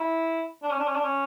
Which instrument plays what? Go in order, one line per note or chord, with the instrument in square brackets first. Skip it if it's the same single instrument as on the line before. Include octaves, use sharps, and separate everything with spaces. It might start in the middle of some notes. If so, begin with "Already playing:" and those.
Already playing: [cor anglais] E4
D4
C#4
D4
C#4
D4
C#4